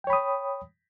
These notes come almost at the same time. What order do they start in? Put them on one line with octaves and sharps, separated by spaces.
G5 C#5 B5 D#6